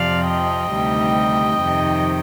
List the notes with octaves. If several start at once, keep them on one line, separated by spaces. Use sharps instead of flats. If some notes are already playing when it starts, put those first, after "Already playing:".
Already playing: F2 C3 F3 D5 F5
D#5 G5
D2 C3 D#3 G3
F2 C3 D#3